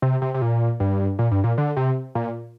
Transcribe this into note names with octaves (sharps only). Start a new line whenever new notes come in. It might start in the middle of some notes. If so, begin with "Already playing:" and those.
C3
C3
C3
A#2
G2
A#2
G2
A#2
D3
C3
A#2